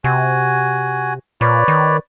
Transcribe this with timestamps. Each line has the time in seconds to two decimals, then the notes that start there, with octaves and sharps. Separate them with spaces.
0.04 C3 F#4 G#5
1.41 A#2 B4 C#5 D5
1.68 D#3